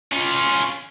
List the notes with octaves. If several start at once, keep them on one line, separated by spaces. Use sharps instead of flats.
C#4 F4